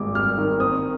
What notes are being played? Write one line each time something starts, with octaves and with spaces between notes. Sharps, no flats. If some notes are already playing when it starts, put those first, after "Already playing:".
Already playing: G#1 G2 D6
G2 F6
D#3
C4 D#6